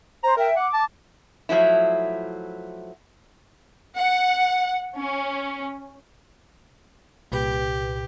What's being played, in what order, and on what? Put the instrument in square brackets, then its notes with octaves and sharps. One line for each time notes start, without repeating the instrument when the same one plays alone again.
[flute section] C5 [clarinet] A#5
[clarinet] A#4 [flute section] E5 G5
[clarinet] F#5 [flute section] D6
[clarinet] A5
[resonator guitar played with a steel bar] F3 F#3 A3 E4
[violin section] F#5
C#4
[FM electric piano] C2 A#2 B4 [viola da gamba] G4